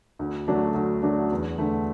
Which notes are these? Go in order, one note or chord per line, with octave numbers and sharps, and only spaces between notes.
D2
D3 F#3 A3 D4
D2
D3 F#3 A3 D4
E2
D3 A3